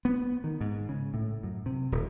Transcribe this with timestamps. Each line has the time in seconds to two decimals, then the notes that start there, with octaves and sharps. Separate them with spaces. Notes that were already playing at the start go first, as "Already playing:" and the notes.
0.05 B3
0.44 D#3
0.61 G#2
0.89 C#3
1.14 A2
1.43 F#2
1.66 C3
1.92 D#1